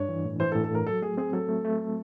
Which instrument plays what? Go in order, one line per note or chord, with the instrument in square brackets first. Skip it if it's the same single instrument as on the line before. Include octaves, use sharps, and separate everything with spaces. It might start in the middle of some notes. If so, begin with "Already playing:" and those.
Already playing: [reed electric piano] G2 D4 [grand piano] C#5
[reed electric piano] E3
A2
[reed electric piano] E3 [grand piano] C5
[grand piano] A4
[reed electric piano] A2
[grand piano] A4
[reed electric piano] A2 [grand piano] A#4
[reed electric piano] F#3 [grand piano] A4
[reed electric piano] A3 [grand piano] G#4
[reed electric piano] C4 [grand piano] G#4
[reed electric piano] F#3 [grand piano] A4
[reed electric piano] A3
A3